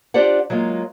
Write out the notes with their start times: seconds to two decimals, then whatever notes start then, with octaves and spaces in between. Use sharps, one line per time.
0.14 D4 F4 G4 C5 D5 F#5
0.50 F#3 G#3 A#3 F4